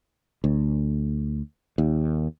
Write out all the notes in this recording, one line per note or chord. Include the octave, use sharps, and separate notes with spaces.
D2
D#2